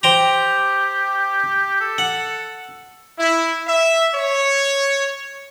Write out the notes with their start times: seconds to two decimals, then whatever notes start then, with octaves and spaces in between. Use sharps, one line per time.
0.03 G4 C5 G5 A#5
1.81 A4
1.98 F#5
3.18 E4
3.66 E5
4.15 C#5